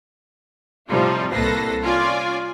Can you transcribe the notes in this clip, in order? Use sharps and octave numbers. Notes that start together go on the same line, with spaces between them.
A2 C3 F3 G3 D#4 F4
C2 A#3 A4 B4 A#6 C7
C#4 F4 D5 G#5